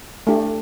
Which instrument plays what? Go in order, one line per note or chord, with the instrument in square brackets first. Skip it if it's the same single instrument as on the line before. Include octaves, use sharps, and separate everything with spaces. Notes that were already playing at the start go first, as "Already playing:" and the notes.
[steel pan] A3 D4 G4